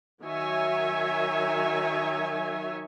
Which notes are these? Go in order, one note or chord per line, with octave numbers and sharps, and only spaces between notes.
D#3 F#3 C#5 E5 G#5